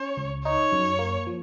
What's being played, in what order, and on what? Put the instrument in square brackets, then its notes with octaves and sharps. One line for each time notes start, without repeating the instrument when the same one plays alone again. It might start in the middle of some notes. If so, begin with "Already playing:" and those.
Already playing: [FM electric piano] C#4 [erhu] C#5
[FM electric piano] C#2
[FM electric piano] D#4 [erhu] C#5
[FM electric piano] F#2
A#3
F3